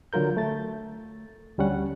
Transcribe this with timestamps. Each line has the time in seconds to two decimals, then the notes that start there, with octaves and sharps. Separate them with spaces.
0.13 D3 F#3 F4 A#4 G6
0.37 A3 A6
1.58 D2 G3 C#4 F#5